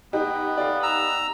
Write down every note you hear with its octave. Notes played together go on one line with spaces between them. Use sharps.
B3 D#4 G4
D5 F5
A#5 E6